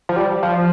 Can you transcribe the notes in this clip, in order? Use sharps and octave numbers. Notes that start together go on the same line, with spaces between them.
F3
G3
F3